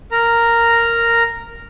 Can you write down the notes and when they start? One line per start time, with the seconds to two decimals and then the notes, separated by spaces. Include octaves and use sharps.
0.12 A#4 A#5